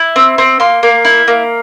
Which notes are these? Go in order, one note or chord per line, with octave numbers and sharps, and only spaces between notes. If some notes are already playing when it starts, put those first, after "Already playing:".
Already playing: E4
C4
C4
A#3 C6
A#3
E4
A#3